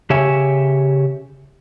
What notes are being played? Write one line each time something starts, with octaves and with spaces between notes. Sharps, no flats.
C#3 G4 C#5 E5 G#5